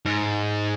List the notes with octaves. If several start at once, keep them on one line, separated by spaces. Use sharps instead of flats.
G#2